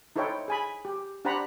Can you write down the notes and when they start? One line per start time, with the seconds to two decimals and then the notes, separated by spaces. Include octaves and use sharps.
0.16 D#4 E4 A4 C5 C#5 G5
0.48 G#4 G#5 B5
0.85 G4
1.25 D4 G4 C5 F#5 A#5 B5